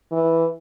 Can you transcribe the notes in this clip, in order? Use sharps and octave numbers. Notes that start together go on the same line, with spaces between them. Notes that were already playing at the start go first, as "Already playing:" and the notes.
E3